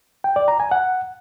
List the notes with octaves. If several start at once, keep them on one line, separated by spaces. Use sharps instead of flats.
G5
D5
A#5
G#5
F#5